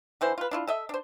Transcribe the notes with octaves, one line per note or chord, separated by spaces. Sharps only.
D3 E3 C5
F4 B4
D4 E4 F4
A4 D#5 E5
D4 C5